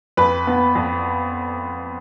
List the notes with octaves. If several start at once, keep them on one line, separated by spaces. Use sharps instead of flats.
F2 B4
B3
F2